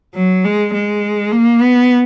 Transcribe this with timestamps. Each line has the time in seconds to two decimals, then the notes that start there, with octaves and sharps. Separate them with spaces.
0.15 F#3
0.45 G#3
0.74 G#3
1.32 A#3
1.61 B3